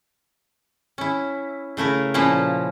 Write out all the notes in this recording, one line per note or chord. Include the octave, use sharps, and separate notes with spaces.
C#4 E4
C#3 A3 E4 A#4
A#2 F3 C#4 E4